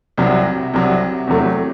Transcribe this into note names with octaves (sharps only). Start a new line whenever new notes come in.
C2 C3 F#3
C2 C3 F#3
E2 C3 F#3 A3